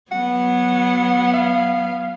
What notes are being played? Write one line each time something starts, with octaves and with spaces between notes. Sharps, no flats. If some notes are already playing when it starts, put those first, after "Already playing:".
F#3 B3 F#5
F5